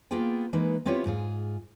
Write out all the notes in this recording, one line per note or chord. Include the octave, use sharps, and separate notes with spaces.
A#3 B3 F4 G#4 G5
E3 G#3 A#3 D#4 B4
B3 C4 E4 F4 G4 C#5
G#2 F4 G#4